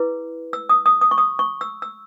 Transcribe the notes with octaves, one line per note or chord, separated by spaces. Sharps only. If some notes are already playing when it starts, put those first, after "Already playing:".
Already playing: E4 G#4 B4
E6
D#6
D#6
D#6
C#6
D#6
C#6
E6
E6